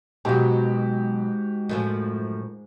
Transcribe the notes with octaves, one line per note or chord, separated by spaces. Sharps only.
G#2 B2 F#3 F#4 G4
F#2 A2 F3